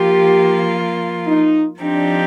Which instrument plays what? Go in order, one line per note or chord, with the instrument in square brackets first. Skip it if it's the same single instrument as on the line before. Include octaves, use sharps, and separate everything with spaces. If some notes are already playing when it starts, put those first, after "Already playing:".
Already playing: [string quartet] F3 A#3 F4 [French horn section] G4
[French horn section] D#4
[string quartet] F3 C4 D#4 G4 [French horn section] D4